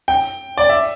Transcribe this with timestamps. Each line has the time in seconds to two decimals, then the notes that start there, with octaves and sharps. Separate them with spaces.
0.08 G5
0.58 D5
0.69 E5